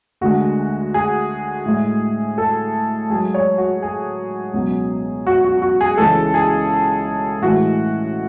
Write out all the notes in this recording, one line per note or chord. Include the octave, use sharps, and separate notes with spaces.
D2 D3 G#3 F#4
G#4
A2 G#3
A4
G#2 F#3 G#4
C#5
F#4
G#4
C#2 B2 F#3
F#4
F#4
F#4
G#4
C#2 C#3 E3 G#3 A4
G#4
A2 E3 G#3 F#4